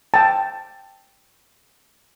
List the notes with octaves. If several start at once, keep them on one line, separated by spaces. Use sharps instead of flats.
G5 A5